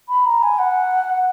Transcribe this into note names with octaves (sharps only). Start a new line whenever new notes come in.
B5
A#5
G#5
F#5